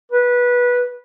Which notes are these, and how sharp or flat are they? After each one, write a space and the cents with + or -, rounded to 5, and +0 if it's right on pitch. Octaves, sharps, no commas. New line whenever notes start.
B4 -15